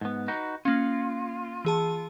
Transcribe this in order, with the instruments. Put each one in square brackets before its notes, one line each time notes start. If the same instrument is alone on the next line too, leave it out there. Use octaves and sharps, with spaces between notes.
[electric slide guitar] G#2 B3
D#4 F#4 B4
[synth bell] A#3 C#4 [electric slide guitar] F4
[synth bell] E3 G#4 A5